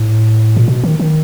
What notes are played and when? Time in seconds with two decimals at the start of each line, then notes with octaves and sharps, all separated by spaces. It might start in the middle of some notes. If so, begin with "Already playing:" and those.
Already playing: A2
0.57 A#2
0.68 B2
0.84 D#3
1.00 D#3